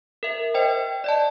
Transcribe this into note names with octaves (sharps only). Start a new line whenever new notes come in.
A#4 E5
C5 D#5 G5
D5 D#5 A5